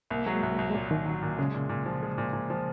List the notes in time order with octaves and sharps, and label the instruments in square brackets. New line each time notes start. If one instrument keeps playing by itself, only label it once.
[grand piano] C2 [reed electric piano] A#3
[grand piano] F#3 [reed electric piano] G#3
[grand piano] C2
C2
[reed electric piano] G#3
[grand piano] A#2 [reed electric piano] F#3
[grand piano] C2 [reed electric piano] D#3
[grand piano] F#3
A#2
[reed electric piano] C#3 [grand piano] G#3
[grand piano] A#2
A#2
F3
G#3
A#2
A#2
F3